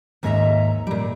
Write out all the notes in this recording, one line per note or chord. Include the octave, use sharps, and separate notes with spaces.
D#2 G#2 C#5 D#5 E5 A#5
A#2 G3